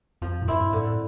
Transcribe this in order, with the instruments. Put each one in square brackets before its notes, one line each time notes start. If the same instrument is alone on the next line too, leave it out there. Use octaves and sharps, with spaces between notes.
[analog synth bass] F2 [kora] F3
[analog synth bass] A2
[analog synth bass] G2 [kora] C4 E4
[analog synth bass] A2 [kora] D3